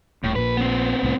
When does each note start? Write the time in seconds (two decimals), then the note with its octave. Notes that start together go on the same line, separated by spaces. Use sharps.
0.24 D#1 A2
0.35 A#1 A#2 B4
0.57 B3 C4
1.03 C2 A2